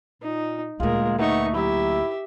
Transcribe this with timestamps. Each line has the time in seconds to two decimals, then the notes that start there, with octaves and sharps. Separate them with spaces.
0.22 A#2 D#4
0.80 D2 A#2 G#3 F4 G#4 A#4
1.19 A3 B3 D#4 C#6
1.55 F#3 E4 G4 E5